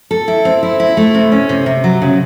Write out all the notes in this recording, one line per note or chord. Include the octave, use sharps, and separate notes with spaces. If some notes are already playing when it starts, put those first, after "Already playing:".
A4
E4
C4
E4
E4
A3
C3
C#4
C3
C3
F#3
C#3